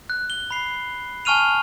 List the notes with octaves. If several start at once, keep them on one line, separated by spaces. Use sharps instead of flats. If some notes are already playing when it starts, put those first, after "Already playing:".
F#6
G7
B5 C7
G#5 A5 C#6 F6 D#7 F7